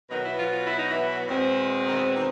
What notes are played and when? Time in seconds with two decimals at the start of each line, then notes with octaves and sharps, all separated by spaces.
0.10 B2 D#3 F#3 B3 D#4
0.25 E3 E4
0.39 F3 F4
0.54 F4
0.66 E4
0.78 D#4
0.90 E3 E4
1.27 E2 B2 G#3 C4
1.86 D#3 D#4
2.15 D#3 D#4